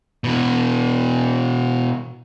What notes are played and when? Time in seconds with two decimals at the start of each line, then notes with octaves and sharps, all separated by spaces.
0.24 B2 E3